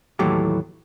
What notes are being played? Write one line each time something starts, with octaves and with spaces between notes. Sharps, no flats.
D#2 A2 E3 F#3 A3 G4